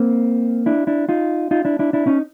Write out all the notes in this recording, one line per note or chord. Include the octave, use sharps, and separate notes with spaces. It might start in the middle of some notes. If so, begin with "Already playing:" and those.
Already playing: A#3 C4
D4 E4
D4 E4
D#4 F4
D#4 F4
D4 E4
D4 E4
D4 E4
C#4 D#4